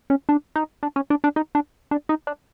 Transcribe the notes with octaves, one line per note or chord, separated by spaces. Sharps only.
C#4
D4
D#4
D4
C#4
D4
D4
D#4
D4
D4
D#4
D4